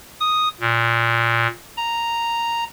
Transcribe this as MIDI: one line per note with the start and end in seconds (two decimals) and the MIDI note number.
0.20 0.48 87
0.61 1.47 46
1.77 2.64 82